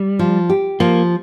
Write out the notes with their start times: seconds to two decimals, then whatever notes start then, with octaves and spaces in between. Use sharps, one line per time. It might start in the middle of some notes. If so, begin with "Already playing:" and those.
Already playing: G3
0.19 F3
0.50 G4
0.80 F3 A#3